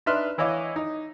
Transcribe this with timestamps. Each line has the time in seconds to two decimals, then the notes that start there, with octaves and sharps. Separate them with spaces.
0.06 D4 D#4 B4 E5 C6 F6
0.38 E3 E4 C#5 D#5 F5 D6
0.76 D#4